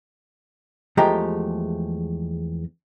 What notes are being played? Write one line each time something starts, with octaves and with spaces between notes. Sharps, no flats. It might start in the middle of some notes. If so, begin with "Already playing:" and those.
E2 F3 G#3 A3 G4 A#5